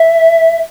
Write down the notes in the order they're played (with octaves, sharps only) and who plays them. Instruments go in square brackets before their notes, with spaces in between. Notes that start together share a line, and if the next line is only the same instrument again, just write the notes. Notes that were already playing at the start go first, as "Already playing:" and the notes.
Already playing: [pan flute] E5